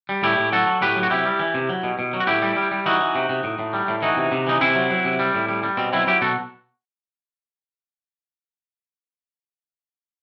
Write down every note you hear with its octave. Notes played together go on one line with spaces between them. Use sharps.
G3
A2 E4 G4
A2
F#3 F#4 A4
F#3
A2 G4 B4
F#3
F#4
C3 E4 G4
G3
E3
C3
F#3
B2
B2
F#3
F#4
A2 E4 G4
G3
G3
G3
E3 D#4 F#4
E3
C3
C3
A2
A2
G3
A2
E3 D#4 F#4
C3
C3
E3 D#4
C3 C4 E4
F#3
F#3
C3
G3
A2
G3
G3
B2 C4
F#3 C4 E4
F#3 E4 G4
B2 F#4 A4